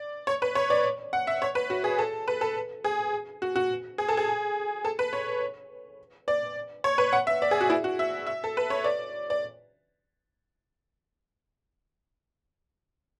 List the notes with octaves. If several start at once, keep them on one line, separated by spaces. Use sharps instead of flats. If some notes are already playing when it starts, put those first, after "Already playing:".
Already playing: D5
C#5
B4
C#5
D5
F#5
E5
C#5
B4
F#4
G#4
A4
B4
A4
G#4
F#4
F#4
G#4
A4
G#4
A4
B4
C#5
D5
C#5
B4
F#5
E5
D5
G#4
F#4
E4
F#4
E5
E5
A4
B4
C#5
D5
D5